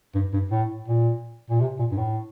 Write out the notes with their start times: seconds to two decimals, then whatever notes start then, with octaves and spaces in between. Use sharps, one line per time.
0.15 G2
0.33 G2
0.51 A2
0.88 A#2
1.50 A#2
1.61 C3
1.79 A#2
1.91 G2
1.97 A2